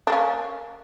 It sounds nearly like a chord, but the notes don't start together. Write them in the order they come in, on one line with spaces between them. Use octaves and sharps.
D4 A#3 C#4